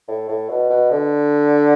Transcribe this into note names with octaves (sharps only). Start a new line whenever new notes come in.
A2
A2
B2
B2
D3